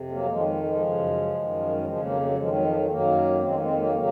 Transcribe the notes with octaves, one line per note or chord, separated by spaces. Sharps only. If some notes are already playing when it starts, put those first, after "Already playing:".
Already playing: F2 C3
F#3 A#3
F2 D#3 F3 G#3
F3 G#3
F#2 C#3
F#2 D#3
F#3
F2 C#3 F3 G#3
F#3 A#3
F#3
F2 D#3 F3 G#3
F#3
F3
F#3
G#3
F#2 D#3 F#3 A#3
F2 D#3 G#3 C4
A#3
G#3 C4
F#3 A#3
C#3 F#3 A#3